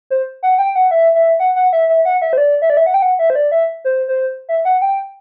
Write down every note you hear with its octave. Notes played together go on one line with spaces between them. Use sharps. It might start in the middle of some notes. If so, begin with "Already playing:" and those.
C5
F#5
G5
F#5
E5
E5
F#5
F#5
E5
E5
F#5
E5
C5
D5
E5
D5
E5
F#5
G5
F#5
E5
C5
D5
E5
C5
C5
E5
F#5
G5